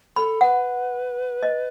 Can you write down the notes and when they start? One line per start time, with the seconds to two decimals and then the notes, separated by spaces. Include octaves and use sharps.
0.16 A4 B5
0.41 B4 F#5
1.43 D#5